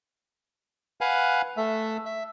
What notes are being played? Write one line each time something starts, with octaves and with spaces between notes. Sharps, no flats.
B4 F5 F#5 G#5
A3 E5
E5